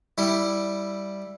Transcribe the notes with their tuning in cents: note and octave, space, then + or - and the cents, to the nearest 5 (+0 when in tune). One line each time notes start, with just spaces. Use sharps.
G3 +0 E4 +0